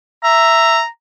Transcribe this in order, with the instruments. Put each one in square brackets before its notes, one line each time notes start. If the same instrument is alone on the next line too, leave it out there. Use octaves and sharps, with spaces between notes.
[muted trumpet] E5 [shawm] A#5